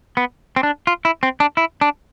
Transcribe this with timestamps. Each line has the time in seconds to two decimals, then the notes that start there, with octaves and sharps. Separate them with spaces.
0.17 B3
0.56 C4
0.63 D4
0.87 F4
1.05 E4
1.23 C4
1.40 D4
1.57 E4
1.81 D4